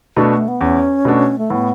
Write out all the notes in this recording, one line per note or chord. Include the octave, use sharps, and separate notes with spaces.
B2 A3 D4 F#4
A3
B3
E2 C#4
B2 A3 D4 F#4
A3
A2 B3